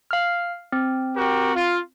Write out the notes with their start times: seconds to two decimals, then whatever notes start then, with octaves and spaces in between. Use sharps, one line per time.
0.11 F5 F6
0.72 C4
1.15 F#4 G4 A#4
1.55 F4